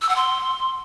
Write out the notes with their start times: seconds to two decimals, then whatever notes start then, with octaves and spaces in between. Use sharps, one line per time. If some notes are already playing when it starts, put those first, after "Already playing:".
0.02 E6
0.09 F#5
0.16 C6